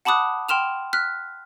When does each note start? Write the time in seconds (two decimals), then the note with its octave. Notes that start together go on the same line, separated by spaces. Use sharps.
0.05 F#5 A5 B5 D6 D#6 F#6
0.49 G5 C6 F6 E7 F7
0.93 F6 F#6 B6